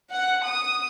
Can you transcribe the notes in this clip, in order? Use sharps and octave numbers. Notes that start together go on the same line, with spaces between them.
F#5
D#6